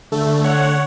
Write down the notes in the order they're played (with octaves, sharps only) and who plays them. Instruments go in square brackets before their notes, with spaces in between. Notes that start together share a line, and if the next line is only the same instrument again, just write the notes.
[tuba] D3 [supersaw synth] A3
[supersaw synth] C#5 F#5